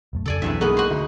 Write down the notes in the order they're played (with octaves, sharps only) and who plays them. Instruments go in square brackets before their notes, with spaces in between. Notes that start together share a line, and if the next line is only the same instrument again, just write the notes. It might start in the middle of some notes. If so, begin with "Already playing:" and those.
[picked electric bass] E1 F#2 A3
[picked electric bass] F2 C#3 [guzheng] A4 D5 G#5
[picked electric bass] B1 F#3 D4 [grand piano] E2 [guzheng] G2 C3 E5
[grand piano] G#3 A#3 G#4 [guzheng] B3 D#4 F#4
[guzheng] F#4 C5
[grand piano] D2